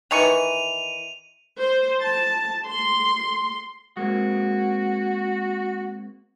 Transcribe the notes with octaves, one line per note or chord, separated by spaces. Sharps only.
D#3 E3 C#6 D#7 F7
C5
A5
C6
G#3 A#3 C4 F#4